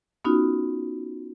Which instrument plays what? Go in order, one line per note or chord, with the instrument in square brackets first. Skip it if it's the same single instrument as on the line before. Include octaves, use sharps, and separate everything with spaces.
[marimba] B3 C#4 D#4 F4 F#4